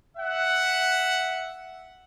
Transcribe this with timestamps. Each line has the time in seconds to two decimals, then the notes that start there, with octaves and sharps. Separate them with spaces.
0.17 E5 F#5